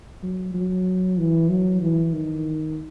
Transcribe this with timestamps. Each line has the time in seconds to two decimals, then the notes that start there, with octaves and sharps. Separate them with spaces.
0.23 F#3
0.54 F#3
1.18 E3
1.49 F#3
1.81 E3
2.13 D#3